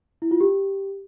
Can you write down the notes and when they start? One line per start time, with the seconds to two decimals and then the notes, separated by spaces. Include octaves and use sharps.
0.22 E4
0.31 F4
0.40 G4